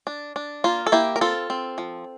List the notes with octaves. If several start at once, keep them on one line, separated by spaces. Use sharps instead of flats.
D4
D4
A#3 F4
A4
A#3 E4 G4
A#4
C4 F4 A4
C4
F3